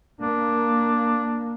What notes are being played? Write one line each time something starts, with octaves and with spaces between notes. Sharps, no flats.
A#3 D4